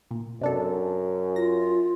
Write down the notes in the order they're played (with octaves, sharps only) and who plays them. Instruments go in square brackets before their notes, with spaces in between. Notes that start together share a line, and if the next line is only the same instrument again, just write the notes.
[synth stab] A#2
[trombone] F#2 [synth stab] C3 D4 A4
[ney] F4 [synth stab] A#6